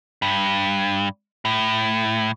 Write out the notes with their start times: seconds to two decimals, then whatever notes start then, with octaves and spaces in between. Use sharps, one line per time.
0.22 G2
1.45 A2